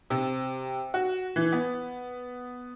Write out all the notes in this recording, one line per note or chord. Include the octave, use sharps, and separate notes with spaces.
C3
F#4
E3
B3